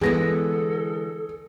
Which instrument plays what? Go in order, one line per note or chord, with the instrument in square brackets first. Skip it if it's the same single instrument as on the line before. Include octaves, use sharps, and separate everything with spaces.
[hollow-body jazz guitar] D3 B3 E4 [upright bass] E3 G#3 [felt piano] G#4 A#6 [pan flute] A4